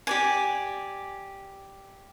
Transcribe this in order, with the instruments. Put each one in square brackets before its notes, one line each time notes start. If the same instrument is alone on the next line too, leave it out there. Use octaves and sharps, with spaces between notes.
[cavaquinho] G4 D5 G#5